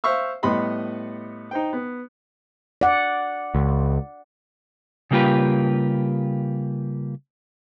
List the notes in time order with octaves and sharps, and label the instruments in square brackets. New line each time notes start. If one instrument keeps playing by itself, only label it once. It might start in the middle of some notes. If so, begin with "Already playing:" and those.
[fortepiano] C5 E5 F5 C#6 E6
A2 G3 B3 D#5 B5 C6
D#4 C5 G5
B3
[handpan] D5 F#5
[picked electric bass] C#2
[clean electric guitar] C#3 G3 A#3 F4 G4 B4